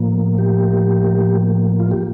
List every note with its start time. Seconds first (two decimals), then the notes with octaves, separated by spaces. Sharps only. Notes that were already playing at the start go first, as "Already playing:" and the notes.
Already playing: A2 F3 A#3
0.38 G4
1.80 F4
1.91 G4